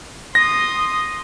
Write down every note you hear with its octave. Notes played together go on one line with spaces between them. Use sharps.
C6 D#6 A#6